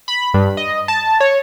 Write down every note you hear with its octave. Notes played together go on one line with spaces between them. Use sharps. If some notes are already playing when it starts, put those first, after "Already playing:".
B5
G2
D#5
A5
C#5